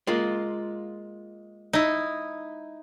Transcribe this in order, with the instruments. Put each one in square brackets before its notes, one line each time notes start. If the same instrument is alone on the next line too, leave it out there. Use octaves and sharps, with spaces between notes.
[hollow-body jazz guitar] G#3 A#3 F4
[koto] D#4 E4